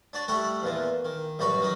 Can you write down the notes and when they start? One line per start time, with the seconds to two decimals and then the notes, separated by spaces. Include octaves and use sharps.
0.13 D4 F#4 D5
0.28 G3 A3 E4 E5 F#5 C#6
0.62 E2 A#2 E3
1.05 D#3
1.39 A1 F#2 G3 F#4 B4 C#6
1.61 D#3 F#3 D#4